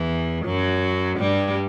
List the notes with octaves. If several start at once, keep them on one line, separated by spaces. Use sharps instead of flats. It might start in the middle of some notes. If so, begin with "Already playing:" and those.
Already playing: E2 E3
F#2 F#3
G2 G3